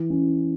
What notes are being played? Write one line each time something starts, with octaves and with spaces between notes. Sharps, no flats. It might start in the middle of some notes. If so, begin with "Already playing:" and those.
Already playing: E3
C#4